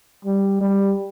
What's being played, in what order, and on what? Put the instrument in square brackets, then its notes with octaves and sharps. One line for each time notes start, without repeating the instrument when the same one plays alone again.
[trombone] G3
G3